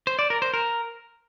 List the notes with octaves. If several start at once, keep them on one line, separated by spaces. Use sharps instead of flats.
C5
D5
A#4
C5
A#4